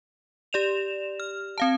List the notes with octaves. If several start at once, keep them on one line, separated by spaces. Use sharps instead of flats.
G4 D5 E7 F7
F6
C4 F5 A5